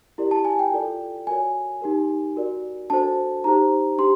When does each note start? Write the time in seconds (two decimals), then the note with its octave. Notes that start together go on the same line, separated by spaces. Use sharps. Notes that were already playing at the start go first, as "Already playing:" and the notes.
0.18 E4 G4 A#4 D5
0.31 A5
0.45 G#5
0.59 G5
0.72 F4 A4 D5
1.27 F#4 A#4 C#5 G#5
1.81 D#4 G4 A#4
2.36 F#4 A#4 D5
2.90 D4 F#4 A4 C5 A5
3.44 D#4 G4 C5 A#5
3.98 D4 G4 C6